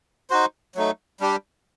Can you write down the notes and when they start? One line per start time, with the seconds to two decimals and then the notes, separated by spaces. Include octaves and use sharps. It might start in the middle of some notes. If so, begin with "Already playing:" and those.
0.30 D#4 F#4 C5
0.75 F#3 A3 D#4
1.20 G3 D4 G4